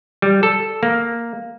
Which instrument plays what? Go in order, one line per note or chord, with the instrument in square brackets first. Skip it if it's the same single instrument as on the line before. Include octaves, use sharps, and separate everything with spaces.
[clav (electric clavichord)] G3
A4
A#3